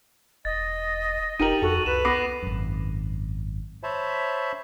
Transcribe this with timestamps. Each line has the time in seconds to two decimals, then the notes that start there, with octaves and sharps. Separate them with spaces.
0.45 E1 D#5 A6
1.39 F1 D#4 G4 A#4 D#7 F7 F#7
1.62 F2 F#4 A4
1.86 C2 B4 E7
2.05 B3 B5 D6 D#6 A#6 C7
2.43 G#1 F#2
3.83 C5 C#5 E5 A5 B5